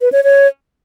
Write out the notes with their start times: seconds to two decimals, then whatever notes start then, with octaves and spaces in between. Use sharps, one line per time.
0.01 B4
0.12 C#5
0.24 C#5